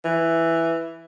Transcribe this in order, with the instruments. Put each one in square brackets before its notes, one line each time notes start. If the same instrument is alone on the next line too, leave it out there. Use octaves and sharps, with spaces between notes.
[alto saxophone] E3